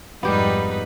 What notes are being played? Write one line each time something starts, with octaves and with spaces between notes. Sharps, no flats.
F2 G#2 G3 B3 D#4 G4 B4